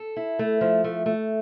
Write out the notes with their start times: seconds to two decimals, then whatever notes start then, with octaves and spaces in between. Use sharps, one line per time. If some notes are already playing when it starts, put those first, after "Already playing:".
Already playing: A4
0.16 E4
0.39 A3
0.61 F3
0.84 A3
1.06 A3